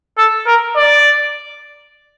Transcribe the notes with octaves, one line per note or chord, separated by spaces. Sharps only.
A4
A#4
D5